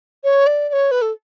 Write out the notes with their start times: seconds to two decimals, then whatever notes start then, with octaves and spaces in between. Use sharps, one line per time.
0.24 C#5
0.47 D5
0.69 D5
0.73 C#5
0.91 B4
1.02 A4